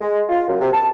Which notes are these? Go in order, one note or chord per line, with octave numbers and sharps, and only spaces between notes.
G#3
F4
F#2
C3
A5